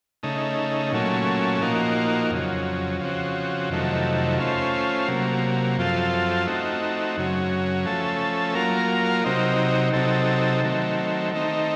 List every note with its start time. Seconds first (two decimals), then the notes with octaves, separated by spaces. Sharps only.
0.23 C#3 A3 D#4
0.92 A#2 F#3 A3 C#4
1.62 A#2 F3 A#3 D#4 F#4
2.31 F2 C#3 F#3
3.00 C#3 F3 C4 F#4
3.70 F2 C3 D#3 F#3 A3
4.39 A3 C#4 F4 C5
5.08 C3 F#3 A#3
5.78 F#2 F3 C4 F4 A4
6.47 A3 C4 D#4 F#4
7.17 F#2 C#3 F#3
7.85 F3 A3 C#4 A4
8.55 F#3 A#3 F4 A#4
9.24 C3 F#3 C4 D#4
9.93 C3 F#3 C4 D#4 A4
10.63 D#3 F#3 A3 C4
11.33 D#3 A3 C4 D#4